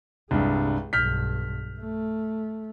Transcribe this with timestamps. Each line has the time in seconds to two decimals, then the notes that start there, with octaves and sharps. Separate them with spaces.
0.31 C2 G2 G#3
0.93 B1 G2 F6 G6 B6
1.80 A3